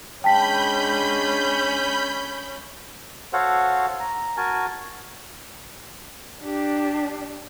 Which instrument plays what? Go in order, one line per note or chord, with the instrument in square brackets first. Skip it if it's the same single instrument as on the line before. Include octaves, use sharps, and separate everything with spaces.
[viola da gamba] G#3 D4 [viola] C#4 [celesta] G5 A5 B6 [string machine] B5 G6
[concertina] F#4 A4 C5 C#5 F5 F#5
A#5
F#4 A#4 G#5 A5
[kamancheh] D4 G4